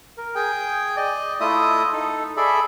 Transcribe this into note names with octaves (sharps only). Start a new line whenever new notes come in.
A#4
G#4 G5
D5 D#5
A3 E4 F4 D#5 E5 D#6
D#4 A4
G#4 A4 D5 E5 B5